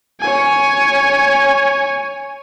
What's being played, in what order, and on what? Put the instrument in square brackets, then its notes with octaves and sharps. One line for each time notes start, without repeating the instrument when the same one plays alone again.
[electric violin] C#5 G#5